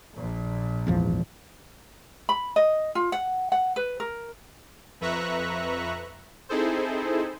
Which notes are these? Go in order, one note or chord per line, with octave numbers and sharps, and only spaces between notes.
A#1 A#2
G#1 E2 F3
B5
D#5
F4
F#5
F#5
B4
A#4
F2 B4 E5 A#5 C#6 F#6
C4 D#4 E4 G#4 A4 C5